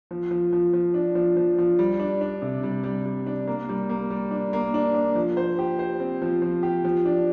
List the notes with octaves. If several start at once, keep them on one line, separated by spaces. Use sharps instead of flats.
F3
F3
F3
F3
D4
F3
F3
F3
G3
D4
D4
C3
G3
G3
G3
D4
A#3
G3
A#3
G3
D4
A#3
D4
D4
F3
C5
G4
C5
C4
F3
F3
G4
F3
D4